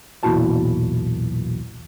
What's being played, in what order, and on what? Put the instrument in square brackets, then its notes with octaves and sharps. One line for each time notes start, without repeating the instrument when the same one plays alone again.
[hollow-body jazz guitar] B1 E2 A#2 E4 F#4 A5